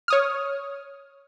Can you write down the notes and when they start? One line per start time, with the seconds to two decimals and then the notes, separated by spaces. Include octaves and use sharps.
0.08 C#5 D#6 F6